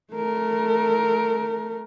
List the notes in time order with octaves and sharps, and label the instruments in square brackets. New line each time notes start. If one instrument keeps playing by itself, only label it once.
[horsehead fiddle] A3 A#4